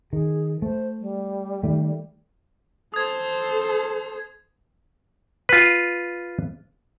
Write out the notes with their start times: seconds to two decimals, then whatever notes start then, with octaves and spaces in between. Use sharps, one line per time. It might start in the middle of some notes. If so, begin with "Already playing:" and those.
0.13 D#3 G#4
0.62 A3 C5
1.01 G3
1.63 D#3 A3
2.94 A4 C5 D#6 G#6
5.49 F4 B4